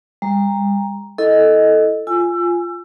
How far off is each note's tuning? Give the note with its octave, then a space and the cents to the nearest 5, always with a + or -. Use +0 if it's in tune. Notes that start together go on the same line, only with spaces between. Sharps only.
G3 +40 A#5 +0
E4 +0 A4 +0 D#5 +5
F4 -5 G#5 +0 E6 +25